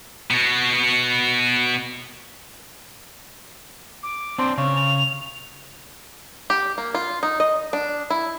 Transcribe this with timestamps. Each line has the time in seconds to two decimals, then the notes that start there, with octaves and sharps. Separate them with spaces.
0.31 B2 F#4
4.03 D6
4.39 C4 D4 C5
4.58 C#3 C#5
4.76 F7
6.50 G4
6.78 A#3
6.94 F4
7.23 D#4
7.40 D#5
7.73 D4
8.10 E4